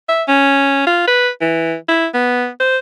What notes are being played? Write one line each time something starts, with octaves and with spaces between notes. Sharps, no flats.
E5
C#4
F4
B4
E3
E4
B3
C5